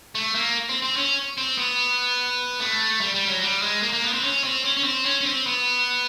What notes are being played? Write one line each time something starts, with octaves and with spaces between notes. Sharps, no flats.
A3
A#3
C4
C4
C#4
C4
B3
A3
G3
G3
F#3
G3
G#3
A#3
A#3
B3
C4
C#4
C4
C#4
C#4
C4
C#4
C#4
C4
B3